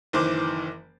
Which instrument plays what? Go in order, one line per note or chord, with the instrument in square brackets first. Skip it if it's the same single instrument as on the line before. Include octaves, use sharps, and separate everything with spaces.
[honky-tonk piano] F#1 D#3 E3 C5 D6